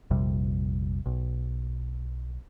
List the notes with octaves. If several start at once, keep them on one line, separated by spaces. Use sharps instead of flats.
A#1 F2 C3 G3
B1